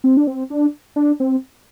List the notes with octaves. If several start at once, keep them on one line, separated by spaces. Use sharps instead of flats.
C4
D4
C4
D4
D4
C4